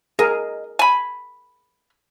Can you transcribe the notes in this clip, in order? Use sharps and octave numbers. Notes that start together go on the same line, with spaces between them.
G#4 A#4 D#5
G#5 B5